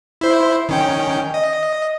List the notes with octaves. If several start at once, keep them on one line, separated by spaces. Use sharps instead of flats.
E4 C5
D#3 C#4 G5
D#5